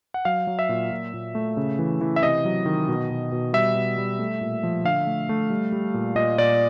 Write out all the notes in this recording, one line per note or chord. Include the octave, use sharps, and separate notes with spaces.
F#5
F#3 F5
F#3
E5
A#2
A#2
A#2
A3
C#3
E3
E3
E5
C3 D#5
F#3
D#3
B2
B2
B2
G3 E5
B2
G3
A3
A#2
F3
D3 F5
A3
A3
G3
G3
A#2
A#2 D#5
A#2 D5